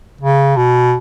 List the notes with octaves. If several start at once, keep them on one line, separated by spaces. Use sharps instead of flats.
C#3
B2